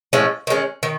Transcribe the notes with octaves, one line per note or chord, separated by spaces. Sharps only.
A2 F3 G#3 C#4
D#3 G#3 C#4
D#3